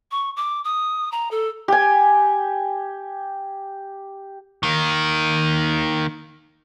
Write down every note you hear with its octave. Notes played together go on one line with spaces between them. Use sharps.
C#6
D6
D#6
A#5
A4
G4 G#5
D#3 A#3